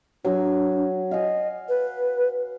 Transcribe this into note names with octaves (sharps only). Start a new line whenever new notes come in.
F#3 D4 G#5
D#5 F5 G#5
B4